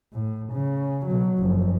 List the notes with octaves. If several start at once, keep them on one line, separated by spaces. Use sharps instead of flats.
A2
C#3
B2 F#3
F#1 F3